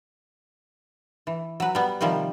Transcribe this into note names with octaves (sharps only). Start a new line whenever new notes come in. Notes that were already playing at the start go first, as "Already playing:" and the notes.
E3
F#3 B4
G3 B3
C3 D#3 F3 G3 A#3